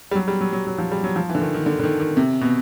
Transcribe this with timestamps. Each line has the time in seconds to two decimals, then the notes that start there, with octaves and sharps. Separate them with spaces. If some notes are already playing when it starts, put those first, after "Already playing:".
0.11 G3
0.15 F#3
0.28 G3
0.41 F#3
0.53 F#3
0.67 F#3
0.78 F3
0.91 G3
1.04 F#3
1.16 F3
1.29 E3
1.35 D3
1.41 D#3
1.54 D#3
1.66 D3
1.80 D3
1.84 D#3
2.00 D#3
2.17 C3
2.41 B2